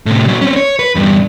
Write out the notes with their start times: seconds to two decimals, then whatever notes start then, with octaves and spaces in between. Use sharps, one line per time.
0.06 A2 C3
0.26 A#2 F#3
0.41 C4 C#4
0.56 C#5
0.79 B4
0.95 E2 G2